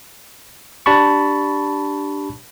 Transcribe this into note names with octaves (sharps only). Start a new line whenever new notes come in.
D4 G4 A5 B5 C#6